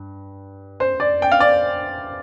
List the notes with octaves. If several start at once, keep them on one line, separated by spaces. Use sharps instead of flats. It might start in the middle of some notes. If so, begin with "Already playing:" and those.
Already playing: G2
C5
D5
G5
F5
D5